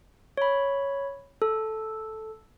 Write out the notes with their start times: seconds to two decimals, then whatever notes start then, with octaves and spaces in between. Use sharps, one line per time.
0.37 C#5 B5
1.42 A4